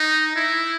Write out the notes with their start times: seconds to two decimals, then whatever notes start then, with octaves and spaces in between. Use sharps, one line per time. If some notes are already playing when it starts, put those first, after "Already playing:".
Already playing: D#4
0.36 E4